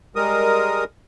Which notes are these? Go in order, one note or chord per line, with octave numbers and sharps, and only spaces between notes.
G3 G#3 A#4 D#6